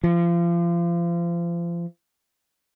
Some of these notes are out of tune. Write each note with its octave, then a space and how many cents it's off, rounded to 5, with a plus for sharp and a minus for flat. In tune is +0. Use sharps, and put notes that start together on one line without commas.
F3 -30